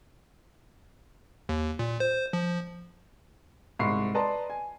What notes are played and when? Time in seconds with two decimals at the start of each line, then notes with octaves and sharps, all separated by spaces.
1.49 D#2
1.79 A#2
2.00 C5
2.33 F3
3.79 C2 G#2 B5 C#6 C7
4.14 B4 D5 D#5 A5 A#5 C6
4.50 G#5